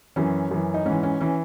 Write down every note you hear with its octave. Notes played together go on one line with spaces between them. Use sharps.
F#2 E3 C#4
F#2 E3
D#4
G#2 E3 C#4
C#4
E3 C#4